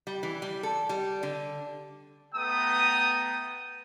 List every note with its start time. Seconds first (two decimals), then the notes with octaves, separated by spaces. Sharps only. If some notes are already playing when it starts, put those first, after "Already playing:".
0.07 G3
0.23 E3
0.42 G3
0.63 A4
0.89 G3
1.23 D3
2.35 A3 B3 B4 G5 A#5 D#6